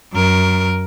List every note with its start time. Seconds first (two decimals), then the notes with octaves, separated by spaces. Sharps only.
0.12 F#2 A#4